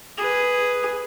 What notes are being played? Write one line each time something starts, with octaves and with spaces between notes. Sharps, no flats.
G#4 B4